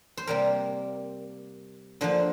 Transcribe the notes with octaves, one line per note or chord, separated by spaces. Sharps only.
C5
C3 G3 A#3 A#4
D3 F3 A#3 C5